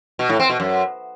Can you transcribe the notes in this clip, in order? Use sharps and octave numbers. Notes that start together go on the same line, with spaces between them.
B2
A2
C4
B2
F#2